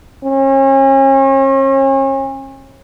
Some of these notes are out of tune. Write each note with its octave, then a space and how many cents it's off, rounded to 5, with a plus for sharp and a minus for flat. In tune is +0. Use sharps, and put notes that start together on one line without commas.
C#4 -40